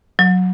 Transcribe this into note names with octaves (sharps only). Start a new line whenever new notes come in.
F#3